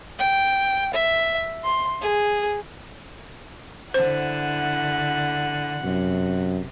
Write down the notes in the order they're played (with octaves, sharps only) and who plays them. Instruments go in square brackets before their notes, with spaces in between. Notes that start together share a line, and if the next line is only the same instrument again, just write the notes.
[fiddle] G5
E5
C6
G#4
[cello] D3 E4 [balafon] C5 [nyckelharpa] F#5
[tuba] F#2 [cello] C3